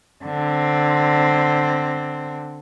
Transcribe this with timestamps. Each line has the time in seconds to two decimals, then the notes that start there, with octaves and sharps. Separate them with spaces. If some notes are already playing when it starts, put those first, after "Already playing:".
0.25 D3 C4